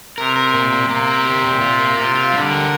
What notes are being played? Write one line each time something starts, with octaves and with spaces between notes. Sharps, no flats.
C3 A#4
A#4
A#2
A#3
C3 A#3
A#4
G4
A#2
F4
A#3
C3 F4
F4
D3 G3
A#4